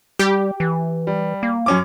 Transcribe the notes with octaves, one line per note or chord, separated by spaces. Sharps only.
G3 G4
E3
G3
A#3
F#2 C#4 D6